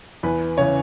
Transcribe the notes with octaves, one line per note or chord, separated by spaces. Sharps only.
E2 B4
C#3 E3 C#5